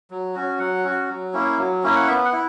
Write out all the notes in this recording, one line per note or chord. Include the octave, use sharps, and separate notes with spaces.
F#3
C#4 F#4
F#3 F#5
C#4 F#4
F#3
A#3 C#4 E4
F#3
A#3 C#4 E4
F#5
B3 E5
F#5
E4